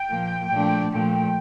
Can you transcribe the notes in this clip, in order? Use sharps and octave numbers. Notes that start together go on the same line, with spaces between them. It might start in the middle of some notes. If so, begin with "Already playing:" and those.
Already playing: G5
A#2 F3 A#3
A#2 F3 A3 D4
A#2 F3 A3 G5